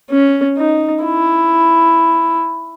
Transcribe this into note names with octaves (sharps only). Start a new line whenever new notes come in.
C#4
D#4
E4